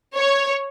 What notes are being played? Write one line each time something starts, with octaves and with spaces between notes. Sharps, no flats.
C#5